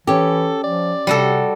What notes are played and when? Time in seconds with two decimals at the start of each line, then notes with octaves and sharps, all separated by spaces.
0.07 E3 C#4 G4 A4
0.64 F3 D5
1.07 C3 G3 F#4 A4